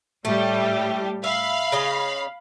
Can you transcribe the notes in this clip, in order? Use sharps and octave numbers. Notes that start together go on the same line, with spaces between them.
A2 G3 A3 G4
E5 F5 B5
C#3 D#5